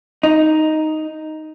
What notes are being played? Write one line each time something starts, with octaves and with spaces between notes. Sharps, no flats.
D#4